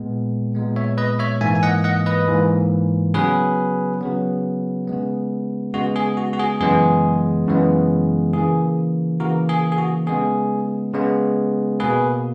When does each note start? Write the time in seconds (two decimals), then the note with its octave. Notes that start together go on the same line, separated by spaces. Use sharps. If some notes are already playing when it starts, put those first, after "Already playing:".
Already playing: A#2 G#3 B3
0.55 A#2 G#3 B3
0.76 C#5 E5
0.98 B4 D#5
1.19 C#5 E5
1.41 G#2 E3 A#3 E5 G#5
1.55 G#5
1.63 D#5 F#5
1.84 D#5 F#5
2.06 B4 D#5
2.27 G#2 E3 A#3
3.14 C#3 F#3 B3 G#4 B4
4.01 C#3 F#3 B3
4.88 C#3 G#3 B3
5.74 C#3 G#3 B3 F#4
5.96 G#4
6.17 F#4
6.33 F#4
6.39 G#4
6.60 F#2 C#3 E3 G#3 B3 G#4
7.47 F#2 C#3 E3 G#3 B3
8.33 C#3 E3 A#3 G#4
9.20 C#3 E3 A#3 F#4 A#4
9.49 G#4
9.72 G#4
9.78 F#4
10.07 C#3 G#3 B3 G#4
10.93 C#3 G#3 B3
11.80 B2 A#3 G#4 B4